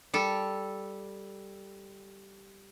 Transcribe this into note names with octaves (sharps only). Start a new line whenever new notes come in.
G3 A4